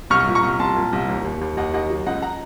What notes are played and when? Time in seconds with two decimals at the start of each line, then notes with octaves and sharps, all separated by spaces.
0.10 C2 C#6 F6
0.27 A#2
0.35 A#5 C#6
0.43 C2
0.59 C2 A5 C6
0.76 A#2
0.93 C2
1.09 D#2
1.24 D#2
1.41 D#2
1.57 D#2 D#5 F#5
1.74 D#2 D#5 F#5
1.90 F#3
2.06 C#2 D#5 F#5
2.22 F#5 A#5